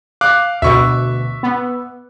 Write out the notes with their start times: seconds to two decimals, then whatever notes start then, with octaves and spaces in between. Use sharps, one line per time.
0.21 F5 D6 F#6
0.62 D2 B2 E5 C#6
1.43 B3